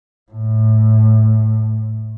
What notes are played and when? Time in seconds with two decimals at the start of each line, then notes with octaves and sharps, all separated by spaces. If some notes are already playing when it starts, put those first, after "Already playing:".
0.32 A2